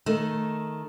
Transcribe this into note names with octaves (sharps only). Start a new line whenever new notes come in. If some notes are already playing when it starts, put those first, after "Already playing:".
D#3 A3